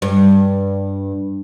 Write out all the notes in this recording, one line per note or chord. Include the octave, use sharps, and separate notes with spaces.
G2